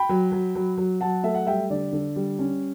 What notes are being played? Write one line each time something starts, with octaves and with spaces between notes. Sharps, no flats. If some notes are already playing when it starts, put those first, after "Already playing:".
Already playing: G5 B5
F#3
F#3
F#3
F#3
F#3 F#5 A5
A3 E5
F#5
G3 E5 G5
D3 D5
D3
G3
C#4